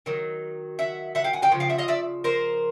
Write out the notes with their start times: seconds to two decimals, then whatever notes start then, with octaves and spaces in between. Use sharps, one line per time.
0.06 D#3 F#3
0.79 E5 F#5
1.15 E5 F#5
1.24 F5 G5
1.33 F#5 G#5
1.42 F5 G5
1.52 C#3 F3
1.60 F5 G5
1.69 E5 F#5
1.78 D#5 F5
1.88 D5 E5
2.24 A#4 C5